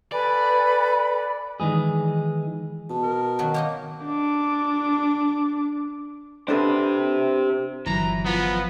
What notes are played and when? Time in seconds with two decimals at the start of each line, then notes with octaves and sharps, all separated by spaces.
0.12 A4 B4 D5 G#5 B5
1.60 D#3 E3 G#3 G#4
2.89 B2 A5
3.03 A#4
3.39 D#3 F#3
3.54 A#3 D#4 D#5
4.04 D4 D6
6.48 D4 G4 A4 B4 C5
7.86 G1 E3 F#3 A#5
8.25 F3 B3 F4